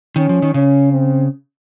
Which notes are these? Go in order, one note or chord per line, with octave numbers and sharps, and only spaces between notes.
D#3 C#4
F3
D#3
C#3 C#4
C4